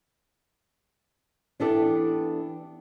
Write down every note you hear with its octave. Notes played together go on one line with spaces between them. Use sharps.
E3 B3 D4 G4 A4 D5